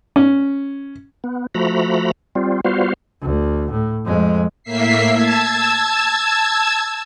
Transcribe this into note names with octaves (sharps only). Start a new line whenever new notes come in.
C#4
B3
F3 A3 F#4 A#5 B5
G3 C4 F4
G3 B3 F4 F#4 C5 F5
D2
A2
F2 G#3
A2 A#3 E5 B6 C7
A5 E6 G#6